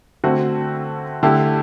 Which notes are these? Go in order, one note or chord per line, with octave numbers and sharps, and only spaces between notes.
D3 A3 C4 F#4
D3 A3 E4 G4